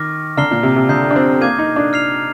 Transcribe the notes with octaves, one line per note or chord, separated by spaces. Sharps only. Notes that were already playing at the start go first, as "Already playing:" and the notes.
Already playing: D#3 D6 F6 A#6
D3 A#5 F6 C7 G7
A#2
C3
C3
D3 A#5 D#6 G6 C7
D4
C4
A#3 D6 G#6 D#7
D#4
D4
F6 C7 F7